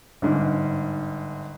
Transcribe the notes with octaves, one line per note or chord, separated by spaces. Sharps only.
G1 G#2